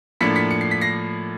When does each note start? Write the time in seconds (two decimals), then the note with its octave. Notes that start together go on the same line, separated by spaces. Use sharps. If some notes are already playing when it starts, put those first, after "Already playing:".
0.21 A2 F3 A#3 D4 B6 C#7
0.35 B6 C#7
0.51 C#7
0.61 C7
0.71 B6
0.81 A#6 C7